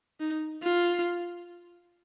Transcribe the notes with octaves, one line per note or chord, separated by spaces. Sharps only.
D#4
F4